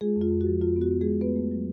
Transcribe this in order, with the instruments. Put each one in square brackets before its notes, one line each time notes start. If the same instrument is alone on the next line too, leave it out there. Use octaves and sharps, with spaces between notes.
[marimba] G#3 F4 G#4
F2
F4
F2
F#4
F3
F2 F4
B3
F#4
B3
F2 G#3 G#4
A3 B3 B4
A3
F#3